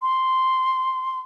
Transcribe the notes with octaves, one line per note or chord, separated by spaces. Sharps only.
C6